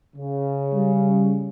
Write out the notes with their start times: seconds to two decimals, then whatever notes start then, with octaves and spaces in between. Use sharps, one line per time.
0.17 C#3
0.73 G3